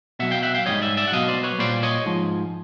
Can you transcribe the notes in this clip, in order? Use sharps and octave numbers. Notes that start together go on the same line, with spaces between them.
B2 F#3 E5 F#5
F5 G5
E5 F#5
F5 G5
G#2 D#3 G3 C#5 D#5
D5 E5
D5 E5
F#5
B2 F#3 D#5 F5
C5 D5
B4 C#5
A#2 G3 C5 D5
C#5 D#5
G#2 F3